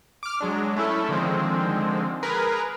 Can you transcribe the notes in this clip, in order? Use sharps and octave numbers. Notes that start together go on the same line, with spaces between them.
D6 F6
F#3 G#3 D4
A3 C#4 E4 A4
D3 D#3 F3 G#3 C4
G#4 A#4 B4